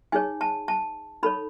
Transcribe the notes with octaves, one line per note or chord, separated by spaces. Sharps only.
D#4 G#4 C#5 G#5
A5
A5
D#4 A4 C#5 B5